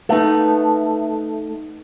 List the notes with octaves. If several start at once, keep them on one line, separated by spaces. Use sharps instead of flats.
A3 B3 D#4